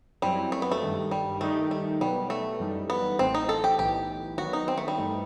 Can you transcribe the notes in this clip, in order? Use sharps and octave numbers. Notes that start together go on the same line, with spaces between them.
F#2 F#3 G3 C4 E4
A3
B3
A3
G2 D#3 G3
G3
D#3 G3 A3 D#4 G4
A3
B2 F#3 G3 B3
A3
F#2 E3 G3 D#4 A4
B3
A1 A2 E3 A3 C4
D#4
A4
G4
B1 A2 E3 B3 D#4 G4
D#3 F#3 B3 F#4
D#4
C4
A3
G3
G2 E3 A3 D#4